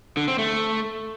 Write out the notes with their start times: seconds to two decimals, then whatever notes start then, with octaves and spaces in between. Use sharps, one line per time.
0.17 D3
0.28 C4
0.39 A3